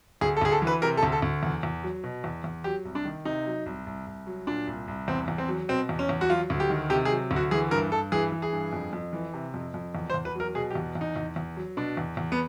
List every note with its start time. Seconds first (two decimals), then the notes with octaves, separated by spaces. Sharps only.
0.21 D2 G#4
0.37 A4
0.41 D2 G#4
0.52 A4
0.62 E3
0.67 B4
0.82 C3 A#4
0.97 A4
1.03 D2
1.12 A4
1.22 D2
1.43 E2
1.63 E2
1.83 F#3
2.04 B2
2.24 E2
2.44 E2
2.64 F#3 G4
2.85 C2
2.95 D4
3.05 D#3
3.25 C3 D#4
3.46 F#3
3.66 C2
3.86 C2
4.07 C2
4.27 F#3
4.47 A#2 D4
4.67 C2
4.88 C2
5.08 E2 C4
5.28 E2
5.38 C4
5.49 F#3
5.69 B2 C4
5.89 E2
5.99 C#4
6.09 E2
6.21 F#4
6.30 F#3 F4
6.50 D2
6.60 G4
6.70 D#3
6.90 C3 G4
7.05 G#4
7.11 F#3
7.31 D2
7.36 F#4
7.51 E3 G#4
7.71 G2 A#4
7.92 G2 A4
8.12 E3 G#4
8.32 E3
8.42 G#4
8.53 G2
8.73 F2
8.93 F2
9.13 E3
9.34 C3
9.54 F2
9.74 F2
9.95 E2
10.10 C5
10.14 E2
10.25 B4
10.35 F#3 A#4
10.55 B2 G#4
10.71 G4
10.75 E2
10.95 E2
11.01 D#4
11.16 E2
11.36 E2
11.57 F#3
11.77 B2 D4
11.97 E2
12.17 E2
12.32 B3